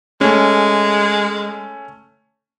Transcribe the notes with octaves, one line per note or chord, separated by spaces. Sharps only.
G#3 A3 C#4